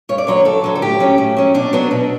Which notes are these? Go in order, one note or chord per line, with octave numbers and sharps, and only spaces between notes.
G2 C#5
D5
D3 F#3 C#5
G2 A4
D3 F#3
A4
A2 G4
F#3 C#4
A2
F#3 C#4
B2 D4
F#3 B3 D4
B2